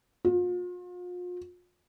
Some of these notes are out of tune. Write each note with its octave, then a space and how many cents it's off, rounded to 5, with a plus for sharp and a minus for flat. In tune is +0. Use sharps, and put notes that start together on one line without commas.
F4 +40